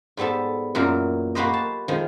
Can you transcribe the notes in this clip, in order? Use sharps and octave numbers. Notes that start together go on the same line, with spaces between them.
G#2 G3 B3 A4 A5
F#2 A#2 E3 A#4
A#3 F#4 G4 B4 C5 D#5
A5
D#3 F3 G#3